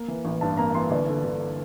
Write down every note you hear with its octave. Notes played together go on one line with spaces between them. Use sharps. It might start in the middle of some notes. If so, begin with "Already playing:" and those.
Already playing: A#3
E3
A1
G2 A5
A#3 A#5
E3 C6
G1 D5
D3
G1